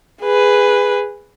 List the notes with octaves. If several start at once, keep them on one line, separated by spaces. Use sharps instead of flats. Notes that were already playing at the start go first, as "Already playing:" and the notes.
G#4 B4